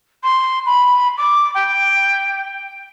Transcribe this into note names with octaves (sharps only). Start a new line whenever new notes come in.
C6
B5
D6
G5